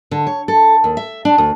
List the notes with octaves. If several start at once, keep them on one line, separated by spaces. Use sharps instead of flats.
D3
C#5
A4
D#2
E5
D4
D2